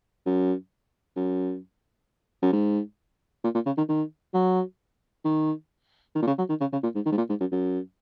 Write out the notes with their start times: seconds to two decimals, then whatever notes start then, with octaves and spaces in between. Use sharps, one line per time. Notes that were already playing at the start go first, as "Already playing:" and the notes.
0.26 F#2
1.16 F#2
2.42 F#2
2.52 G#2
3.44 A#2
3.54 A#2
3.66 C#3
3.77 D#3
3.89 D#3
4.34 F#3
5.24 D#3
6.15 D#3
6.22 A#2
6.27 C#3
6.38 F#3
6.49 D#3
6.60 C#3
6.72 C#3
6.83 A#2
6.95 G#2
7.06 D#3
7.12 G#2
7.17 A#2
7.29 G#2
7.40 F#2
7.51 F#2